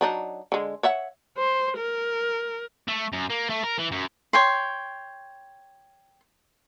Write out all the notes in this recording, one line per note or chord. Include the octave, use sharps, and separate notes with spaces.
F#3 D4 D#4
D3 G#3
C#5 E5 F#5
C5
A#4
A3
F#2
A#3
A3
A#4
E3
F#2
C#5 G5 C6